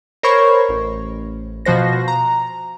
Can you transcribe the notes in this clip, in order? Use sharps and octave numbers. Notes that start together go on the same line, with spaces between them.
A#4 C5 C#5 B5 C#6 G#6
A1
B2 F3 F#4 C5 A#6
A#5